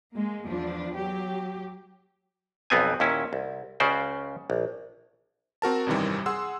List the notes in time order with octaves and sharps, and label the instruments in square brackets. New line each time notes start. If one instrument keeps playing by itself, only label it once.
[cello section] G#3 A#3
E2 F3 D4
F#3 G4
[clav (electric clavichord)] B1 F2 B3 C4 G#5
D#2 A#2 C#4 E4
C2
C#2 C#3 C#4 F#4 C5 D5
A#1
[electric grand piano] C4 F#4 A#4 A5
G#1 F#2 C3 D#3 E3 G3
G#4 F#5 C6 E6